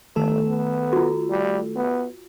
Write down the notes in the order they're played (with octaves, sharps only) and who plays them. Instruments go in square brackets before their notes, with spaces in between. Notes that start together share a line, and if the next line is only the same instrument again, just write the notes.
[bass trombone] G1 [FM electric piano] D#3 A3 A4
[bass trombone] B3
[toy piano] F4 F#4
[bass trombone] G3
B3